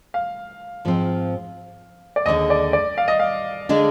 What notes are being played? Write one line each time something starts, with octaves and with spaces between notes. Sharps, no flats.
F5
G#2 F3 C4
D5
D#2 D3 G#3 D#5
D5
D5
F5
D#5
F5
D3 G#3 D4